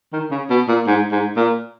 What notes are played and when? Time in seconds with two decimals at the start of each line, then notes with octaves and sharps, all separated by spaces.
0.13 D#3
0.31 C#3
0.50 B2
0.68 A#2
0.87 G#2
1.12 G#2
1.36 A#2